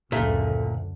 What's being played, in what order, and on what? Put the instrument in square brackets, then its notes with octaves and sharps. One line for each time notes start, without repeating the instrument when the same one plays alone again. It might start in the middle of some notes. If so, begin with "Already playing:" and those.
[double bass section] F#1 D2 D3 [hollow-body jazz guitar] A#2 A3